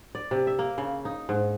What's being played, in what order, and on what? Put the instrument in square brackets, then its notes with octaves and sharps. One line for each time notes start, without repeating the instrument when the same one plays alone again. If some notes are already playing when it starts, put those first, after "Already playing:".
[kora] D5
C3
E5
A#3
C#3
D#4
G#2